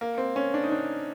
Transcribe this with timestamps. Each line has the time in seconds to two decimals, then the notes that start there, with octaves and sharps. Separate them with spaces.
0.01 A#3
0.18 C4
0.36 C#4
0.54 D4
0.63 D#4
0.71 D4